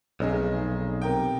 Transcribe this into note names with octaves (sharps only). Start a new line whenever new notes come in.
F1 B1 D#4 G#4
C3 A#4 G5